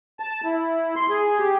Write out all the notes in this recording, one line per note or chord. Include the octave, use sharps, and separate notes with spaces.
A5
E4
C6
G#4
G4